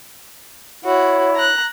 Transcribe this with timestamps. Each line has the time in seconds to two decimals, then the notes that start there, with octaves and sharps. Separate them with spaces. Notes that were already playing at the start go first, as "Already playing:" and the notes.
0.85 E4 F#4 C#5
1.35 A#5 F#6